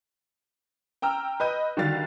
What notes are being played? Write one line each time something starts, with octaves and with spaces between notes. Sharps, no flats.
G5 A#5 E6 F6
B4 D#5 G6 D#7
D3 D#3 G3 F#4 F5 A6